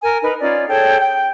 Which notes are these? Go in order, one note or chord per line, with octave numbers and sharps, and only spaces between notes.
A#4 G#5
D#4 A#4 B4
C#4 D#4 F4 D5
G#4 A4 C#5 G5
G5